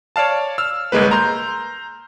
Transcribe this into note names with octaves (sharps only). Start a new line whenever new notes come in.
C#5 D5 F5 A5
E6 F6
G1 C2 G#3 A#3 B4
A#5 C6 G6